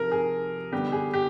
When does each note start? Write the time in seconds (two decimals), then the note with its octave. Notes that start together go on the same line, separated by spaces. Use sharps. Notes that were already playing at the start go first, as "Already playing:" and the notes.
Already playing: C3 F3 A#4
0.11 G#4
0.72 D3 G3 B3 G4
0.92 G#4
1.13 G4